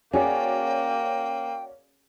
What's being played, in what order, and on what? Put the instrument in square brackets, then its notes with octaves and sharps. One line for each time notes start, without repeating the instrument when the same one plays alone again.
[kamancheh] A#3 [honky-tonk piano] C#4 F#4 D5 [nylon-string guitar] G#4 [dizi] G5